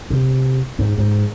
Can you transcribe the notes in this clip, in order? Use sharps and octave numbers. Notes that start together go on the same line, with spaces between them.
C3
G#2
G#2